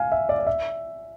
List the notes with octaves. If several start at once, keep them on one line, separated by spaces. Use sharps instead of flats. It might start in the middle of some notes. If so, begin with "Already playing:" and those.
Already playing: F5 G#5
E5
D5
D5
E5